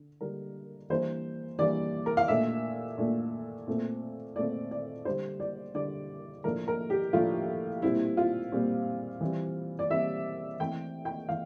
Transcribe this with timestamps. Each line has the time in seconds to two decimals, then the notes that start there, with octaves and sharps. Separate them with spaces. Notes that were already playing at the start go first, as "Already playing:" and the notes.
Already playing: D3
0.21 D3 G3 D4 A#4
0.90 E3 G3 A#3 D4 C5
1.59 E3 G3 A#3 D4 D5
2.06 A#4
2.17 F5
2.28 A#2 A3 D4 E5
2.98 A#2 A3 D4
3.67 A#2 A3 C4
4.36 A#2 A3 C4 D5
4.71 D5
5.05 D3 G3 D4 C5
5.40 D5
5.75 D3 G3 D4 D5
6.44 A2 F3 A#3 D4 A#4
6.68 A#4
6.90 G4
7.13 A2 F3 A#3 D4 F4
7.82 A#2 G3 C4 E4
8.17 F4
8.52 A#2 G3 C4
9.21 E3 G3 C4
9.79 D5
9.90 E3 G3 C4 E5
10.59 E3 A3 C4 G5
11.05 G5
11.29 E3 F5